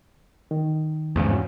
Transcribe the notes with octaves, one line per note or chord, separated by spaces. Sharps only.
D#3
E2 G#2 C#3
G2 C#4 F#4